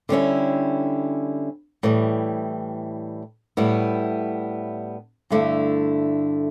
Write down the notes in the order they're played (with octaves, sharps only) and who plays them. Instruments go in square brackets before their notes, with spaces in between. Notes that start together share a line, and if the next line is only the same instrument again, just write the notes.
[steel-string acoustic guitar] D3 G3 C#4 E4
A2 E3 G3
A2 G3 B3 E4
G2 D3 A3 E4